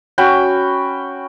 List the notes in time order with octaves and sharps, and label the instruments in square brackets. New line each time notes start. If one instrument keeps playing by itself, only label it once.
[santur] C#4 F#4 G5 B5